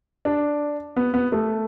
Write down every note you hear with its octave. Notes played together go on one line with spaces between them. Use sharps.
D4
B3
B3
A3